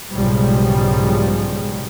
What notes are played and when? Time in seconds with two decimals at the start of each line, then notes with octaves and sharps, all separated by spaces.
0.11 B1 G#2 C#3 F3 G3 G#3